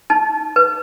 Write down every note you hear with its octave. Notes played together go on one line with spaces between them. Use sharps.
D#4 A5
B4